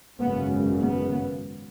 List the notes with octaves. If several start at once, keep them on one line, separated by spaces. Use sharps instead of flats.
G#1 F#2 C#3 B3
B3